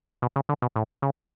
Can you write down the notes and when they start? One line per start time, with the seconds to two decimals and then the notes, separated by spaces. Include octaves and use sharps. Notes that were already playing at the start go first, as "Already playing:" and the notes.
0.22 B2
0.36 C#3
0.49 D3
0.62 B2
0.76 A2
1.02 C#3